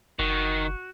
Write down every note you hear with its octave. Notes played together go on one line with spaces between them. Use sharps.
F#1 D#3 F#4